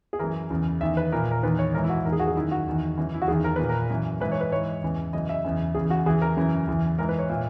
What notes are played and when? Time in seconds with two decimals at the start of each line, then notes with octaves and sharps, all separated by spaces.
0.13 G#4
0.19 F#2 E3 A#4
0.50 E2 C#3 E3
0.81 E2 D#3 E5
0.97 B4
1.12 A#2 A#4
1.31 A#4
1.43 E2 D#3 B4
1.59 C#5
1.73 G#2 A#4
1.77 E3
1.84 E4
1.89 F#4
2.05 E2 D#3 A#4
2.12 G#4
2.19 F#4
2.27 G#4
2.36 F#2 D#3 E4
2.51 F#4
2.67 E2 D#3
2.98 F#2 C#3 E3
3.14 E4
3.22 F#4
3.28 E2 D#3 G#4
3.44 A#4
3.56 A#2 B4
3.69 A#4
3.90 F#2 E3
4.20 G#2 E3 B4
4.32 C#5
4.41 B4
4.51 G#2 E3 C#5
4.83 E2 C#3 E3
5.13 F#2 C#3 E3 D#5
5.29 E5
5.45 E2 C#3 E3
5.75 E2 C#3 E3 G#4
5.90 F#4
6.06 E2 C#3 E3 G#4
6.22 A#4
6.37 F#2 C#3 E3
6.67 E2 C#3 E3
6.98 G#2 E3 A#4
7.09 B4
7.19 C#5
7.30 A#2 E5